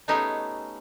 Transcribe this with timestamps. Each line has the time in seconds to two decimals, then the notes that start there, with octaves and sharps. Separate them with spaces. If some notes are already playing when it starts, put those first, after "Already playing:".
0.08 A3 B3 C#4 D#4 G4 G#4